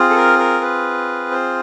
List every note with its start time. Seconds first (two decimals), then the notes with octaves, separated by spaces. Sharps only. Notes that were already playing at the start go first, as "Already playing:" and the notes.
Already playing: C4 F4 G#4
0.10 A4
0.16 A#4
0.38 A#4
0.61 B4
1.31 C5